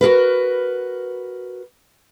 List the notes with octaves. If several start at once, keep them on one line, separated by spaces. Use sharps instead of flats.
F#4 G#4 A#4 B4